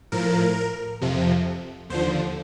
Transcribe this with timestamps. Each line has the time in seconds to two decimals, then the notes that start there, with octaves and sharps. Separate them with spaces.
0.12 A2 F3 A#4
1.01 F2 C3 F3
1.90 D#2 D3 F3 C5